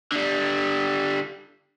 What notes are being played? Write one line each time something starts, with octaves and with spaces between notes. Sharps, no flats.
D3 G3